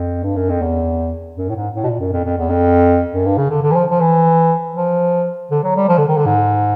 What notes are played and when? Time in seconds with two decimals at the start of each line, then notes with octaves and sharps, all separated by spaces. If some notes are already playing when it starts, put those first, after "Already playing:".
Already playing: F2
0.24 G2
0.36 F#2
0.49 F2
0.62 E2
1.37 F#2
1.50 A2
1.56 G#2
1.75 A2
1.83 B2
1.87 A#2
2.00 F#2
2.13 F2
2.25 F2
2.38 E2
2.50 F2
3.13 F#2
3.25 G2
3.38 C#3
3.50 D3
3.62 D3
3.71 E3
3.75 F3
3.90 F3
4.01 E3
4.76 F3
5.51 D3
5.64 F#3
5.76 G3
5.89 F3
5.98 D3
6.08 D#3
6.17 D3
6.26 G#2